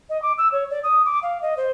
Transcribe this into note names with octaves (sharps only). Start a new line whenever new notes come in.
D#5
D6
E6
C#5
D5
D#6
D6
F5
D#5
C5